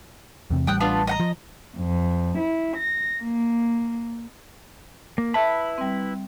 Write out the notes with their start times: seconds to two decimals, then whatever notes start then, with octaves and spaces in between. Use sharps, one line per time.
0.50 E2 C3
0.67 A1 G3 G5 D#6 F#6
0.80 B3 D4 F4
1.07 D#5 F#5 A#5
1.20 F3
1.77 F2
2.38 E4
2.76 A#6
3.22 A#3
5.18 A#3
5.34 E4 B4 E5 A5 B5
5.78 G3 C4